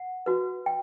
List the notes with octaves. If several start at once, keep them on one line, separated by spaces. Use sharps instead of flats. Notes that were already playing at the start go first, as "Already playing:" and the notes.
Already playing: F#5
F#4 B4
G5